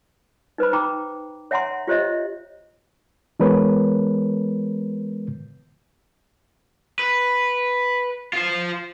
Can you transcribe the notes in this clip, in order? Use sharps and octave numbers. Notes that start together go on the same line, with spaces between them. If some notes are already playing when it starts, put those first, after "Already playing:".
D#4 B4 C5 B5
D#4 G5 A#5 B5 D6
C#5 E5 F#5 G#5 A#5 C6
F4 G4 C5 C#5 D#5 E5
E3 G#3 B3 A#4 B4 C#5
B4
F4 C5